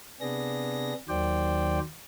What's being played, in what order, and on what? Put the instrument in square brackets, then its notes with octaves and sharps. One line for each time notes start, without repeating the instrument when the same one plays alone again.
[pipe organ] C3 B3 D4 G#4 A#6
D#2 D#3 F#3 C5 D5 G5